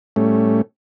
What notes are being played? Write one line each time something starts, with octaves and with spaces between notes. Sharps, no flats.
A2 G3 A3 C#4